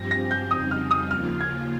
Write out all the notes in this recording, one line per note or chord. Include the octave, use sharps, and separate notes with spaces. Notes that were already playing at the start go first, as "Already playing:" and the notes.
Already playing: G2 F3 C4 G4 A#6
A#6
G6
F2 C#3 G3 C4 D#4 D#6
F6
D#6
D#2 C#3 F3 A#3 F4 F6
G#6